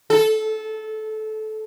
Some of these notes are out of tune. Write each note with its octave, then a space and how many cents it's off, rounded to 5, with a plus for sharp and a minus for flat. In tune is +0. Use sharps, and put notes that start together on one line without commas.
A4 -20